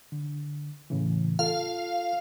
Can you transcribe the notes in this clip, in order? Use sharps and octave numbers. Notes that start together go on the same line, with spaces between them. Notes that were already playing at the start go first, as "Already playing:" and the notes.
D3
A2 C#3 E3
F4 A4 F5